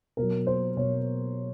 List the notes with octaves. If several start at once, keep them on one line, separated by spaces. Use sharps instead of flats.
B2 F#3 A#4
C5
B2 F#3 C#5